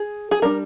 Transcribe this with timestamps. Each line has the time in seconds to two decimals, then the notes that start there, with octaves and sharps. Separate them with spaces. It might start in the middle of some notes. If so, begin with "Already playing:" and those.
Already playing: G#4
0.31 G#4
0.42 G3 D4 A#4